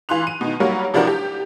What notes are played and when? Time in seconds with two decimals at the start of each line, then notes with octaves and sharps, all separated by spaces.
0.09 E3 F4 C6 F#6 F7
0.27 D#7
0.41 B2 D#3
0.60 F#3 G3 A#3 F#4 A#4 C#5
0.94 C3 F3 D4 E4 F#4 A#4
1.07 G4